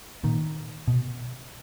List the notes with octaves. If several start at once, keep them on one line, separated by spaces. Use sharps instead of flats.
A#2 D#3
B2